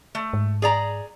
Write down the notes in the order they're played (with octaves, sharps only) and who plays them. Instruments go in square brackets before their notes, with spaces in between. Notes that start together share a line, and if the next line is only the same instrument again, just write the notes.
[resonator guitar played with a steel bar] A3
[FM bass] G#2
[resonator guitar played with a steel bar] G#4 D5 A#5